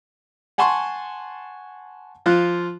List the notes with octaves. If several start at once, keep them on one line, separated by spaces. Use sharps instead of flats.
F#5 G#5 A5 C6 C#6
F3 F4 F#6